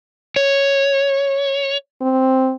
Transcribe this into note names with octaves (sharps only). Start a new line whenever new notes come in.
C#5
C4